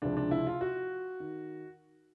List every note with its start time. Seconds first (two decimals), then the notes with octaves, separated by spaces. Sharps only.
0.02 C#2 C3 F3 D4
0.17 D4
0.31 E4
0.47 F4
0.61 F#4
1.20 D#3